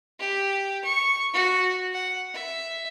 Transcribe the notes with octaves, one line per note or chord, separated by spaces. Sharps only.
G4
C#6
F#4
F#5
E5